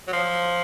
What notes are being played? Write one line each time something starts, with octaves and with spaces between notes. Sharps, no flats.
F#3
F3